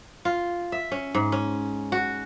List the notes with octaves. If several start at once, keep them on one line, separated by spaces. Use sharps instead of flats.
F4
E5
C#4
G#2
C#4
F#4